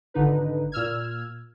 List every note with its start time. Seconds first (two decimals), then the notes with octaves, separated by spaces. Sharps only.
0.14 G#1 D3 D#4 B4
0.72 A#2 E6 F6 G#6